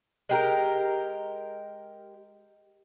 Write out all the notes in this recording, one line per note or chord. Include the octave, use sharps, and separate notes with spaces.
G#3 G4 A#4